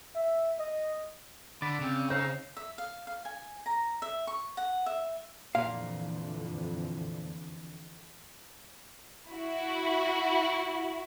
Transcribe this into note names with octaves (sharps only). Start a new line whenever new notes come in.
E5
D#5
D3 D5 B5
C#3 C4
C4 D#4 C#5 F5
E5
F5
F5
G#5
A#5
E5
C#6
F#5
E5
F2 A#2 D3 E3 F5
E4 F#4